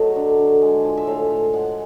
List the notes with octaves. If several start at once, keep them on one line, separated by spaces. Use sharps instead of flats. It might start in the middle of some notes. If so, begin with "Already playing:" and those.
Already playing: F#3 A3 D#5
D3
D3
G#3
F3
E5
A2 F5
A2
G#3 F#5